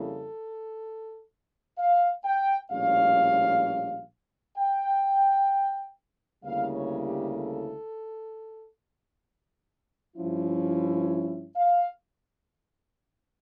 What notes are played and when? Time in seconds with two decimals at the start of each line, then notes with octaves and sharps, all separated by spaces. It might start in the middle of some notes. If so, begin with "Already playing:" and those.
Already playing: F2 C#3 G3 A#3 E4 A4
1.78 F5
2.25 G5
2.71 A#1 A2 G3 C#4 F5
4.58 G5
6.44 D2 C#3 G3 A#3 E4 F5
6.76 C#5
7.07 G4
7.38 A4
10.17 G2 F3 C#4 E4
11.56 F5